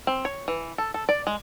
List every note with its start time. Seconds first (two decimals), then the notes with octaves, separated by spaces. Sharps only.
0.07 C4
0.25 C#5
0.48 E3
0.78 A4
0.94 A4
1.09 D5
1.27 G#3